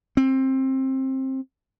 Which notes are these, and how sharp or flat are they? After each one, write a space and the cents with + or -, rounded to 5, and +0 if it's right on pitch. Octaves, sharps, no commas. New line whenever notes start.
C4 +20